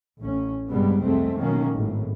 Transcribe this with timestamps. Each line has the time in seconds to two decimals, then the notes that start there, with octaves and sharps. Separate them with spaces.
0.21 A1 C#4
0.70 G2 C3 G3 G#3 B3
1.02 C2 F2 G#3 A3 C4
1.39 B2 D#3 F#3 A#3 C#4
1.73 G#1 A2